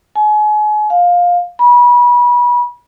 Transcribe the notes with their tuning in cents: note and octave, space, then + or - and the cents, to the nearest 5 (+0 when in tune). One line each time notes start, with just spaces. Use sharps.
G#5 +35
F5 +15
B5 -30